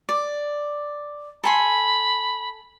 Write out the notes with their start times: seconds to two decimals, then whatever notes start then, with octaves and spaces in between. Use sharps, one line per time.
0.09 D5
1.44 A4 G#5 B5 C6